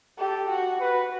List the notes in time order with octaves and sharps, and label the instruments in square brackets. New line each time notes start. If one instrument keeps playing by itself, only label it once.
[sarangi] G4 [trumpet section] A4
[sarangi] F#4
[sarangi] F#4 [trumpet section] B4